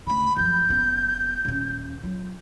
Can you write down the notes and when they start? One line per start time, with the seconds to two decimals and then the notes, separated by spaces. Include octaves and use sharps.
0.07 D2 C#3 B5
0.37 F#2 F3 G6
0.69 F#1 B3
1.45 D#1 C#4
2.03 F#3 F4